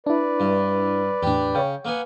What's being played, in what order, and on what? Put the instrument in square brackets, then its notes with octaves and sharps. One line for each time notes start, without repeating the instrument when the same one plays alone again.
[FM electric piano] D4 E4 [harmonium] B4 D5
[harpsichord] G2
[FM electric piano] E2 A2 [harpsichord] D4 G4
[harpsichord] C#3 [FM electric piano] C#5 G5
[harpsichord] A#3 B3 G#5 [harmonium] F#5